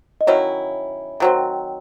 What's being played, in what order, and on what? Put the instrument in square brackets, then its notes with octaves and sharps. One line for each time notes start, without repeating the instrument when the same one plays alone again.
[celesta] D#5
[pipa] D#3 F#3 C#4 E4 [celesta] C#5
[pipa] D#3 F#3 C4